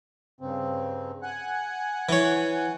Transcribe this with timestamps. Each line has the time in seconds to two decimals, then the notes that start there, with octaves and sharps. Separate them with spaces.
0.41 G2 C#3 C4
1.23 F#5 G#5 F#6
2.09 E3 C#5